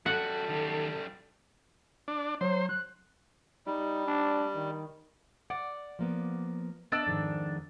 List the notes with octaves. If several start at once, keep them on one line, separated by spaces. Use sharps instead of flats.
F#2 G3 F#4 A4 F#5
D#3 G4
D4
F#3 C5
F#6
G3 D#4
D4
D#3
D5 F#5
F3 A#3 B3
B3 D4 D5 D#5 E6
F2 G#2 D#3